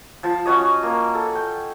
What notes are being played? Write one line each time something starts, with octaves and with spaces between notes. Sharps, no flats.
F3 A5
C#4 F#4 C#5 D#5
A#3
A4
G5